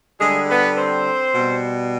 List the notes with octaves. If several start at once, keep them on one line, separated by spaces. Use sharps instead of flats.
D3 G3 G#3 G#4
B3 B4
C4 C5
B2 G3